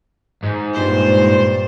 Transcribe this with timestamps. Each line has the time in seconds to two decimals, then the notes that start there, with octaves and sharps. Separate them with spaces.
0.43 G#2
0.74 G2 A#2 C5